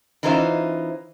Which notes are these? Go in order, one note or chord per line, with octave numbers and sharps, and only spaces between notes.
E3 C#4 D#4 F4 C5 E5